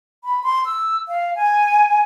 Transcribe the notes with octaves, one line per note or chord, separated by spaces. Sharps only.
B5
C6
E6
F5
G#5